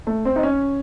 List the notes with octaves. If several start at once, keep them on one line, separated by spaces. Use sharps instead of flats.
A3
C4
D#4
C#4